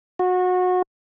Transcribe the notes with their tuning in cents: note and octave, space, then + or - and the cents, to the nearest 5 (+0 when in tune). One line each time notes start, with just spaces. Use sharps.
F#4 -25